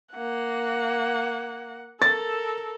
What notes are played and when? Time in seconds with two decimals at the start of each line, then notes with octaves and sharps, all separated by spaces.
0.14 A#3 F#5
2.02 A4 A#4 A6